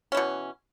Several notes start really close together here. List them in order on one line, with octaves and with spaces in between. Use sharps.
C#4 E3 B2